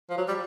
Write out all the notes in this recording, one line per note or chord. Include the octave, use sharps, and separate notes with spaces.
F3
F#3
G3